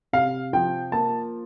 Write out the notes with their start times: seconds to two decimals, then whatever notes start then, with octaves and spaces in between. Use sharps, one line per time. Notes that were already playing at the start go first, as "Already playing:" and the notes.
0.13 C3 F5
0.53 F3 G5
0.92 A#3 A5